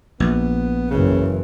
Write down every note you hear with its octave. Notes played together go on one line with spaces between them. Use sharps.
A#1 B3
F#1 C#3 E3